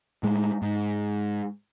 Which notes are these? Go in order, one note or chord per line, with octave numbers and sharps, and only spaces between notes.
A2 G#3
G#2